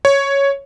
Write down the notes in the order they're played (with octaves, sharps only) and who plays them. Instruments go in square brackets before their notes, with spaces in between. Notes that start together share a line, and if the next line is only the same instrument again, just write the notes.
[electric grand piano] C#5